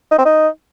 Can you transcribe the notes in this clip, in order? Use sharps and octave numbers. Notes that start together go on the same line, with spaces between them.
D#4
C4
D#4